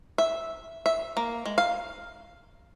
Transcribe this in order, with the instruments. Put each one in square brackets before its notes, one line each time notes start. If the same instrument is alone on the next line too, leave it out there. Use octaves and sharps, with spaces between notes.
[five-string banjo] E5
E5
A#3
G#3
F5